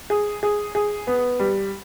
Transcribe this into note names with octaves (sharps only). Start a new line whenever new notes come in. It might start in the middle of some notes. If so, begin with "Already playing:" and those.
G#4
G#4
G#4
B3
G3